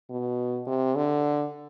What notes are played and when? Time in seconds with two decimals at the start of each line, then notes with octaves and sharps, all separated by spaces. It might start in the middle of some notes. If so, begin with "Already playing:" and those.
0.10 B2
0.67 C3
0.95 D3